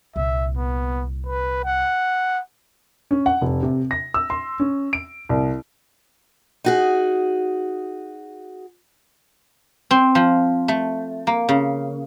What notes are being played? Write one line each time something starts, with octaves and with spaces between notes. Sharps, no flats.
C2 A#2 E5
B3
B4
F#5
C#4
F#5
F1
C3
A#6
E6
C6
C#4
D7
C2
D#4 F#4 G#4
C4
F3
A3
A#3
C#3